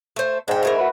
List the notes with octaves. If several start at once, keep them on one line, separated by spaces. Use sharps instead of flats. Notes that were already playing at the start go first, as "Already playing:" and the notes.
A3 C5
G#2 D4 G5
A3 E4 A#4
F#4 B4